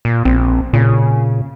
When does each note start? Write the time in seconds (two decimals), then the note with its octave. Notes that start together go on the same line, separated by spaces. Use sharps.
0.05 A#2
0.25 A#1 C4
0.73 A#2 C#3